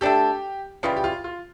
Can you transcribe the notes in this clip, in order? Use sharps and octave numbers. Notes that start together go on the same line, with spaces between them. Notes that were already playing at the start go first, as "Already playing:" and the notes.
A3 D4 G4 A4
C#3 E3 G3 F4
G4
F4
F4